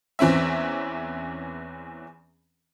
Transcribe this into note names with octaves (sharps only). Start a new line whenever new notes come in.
E2 E3 C4 C#4 E5